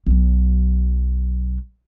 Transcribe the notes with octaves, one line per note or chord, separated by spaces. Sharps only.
B1 F#3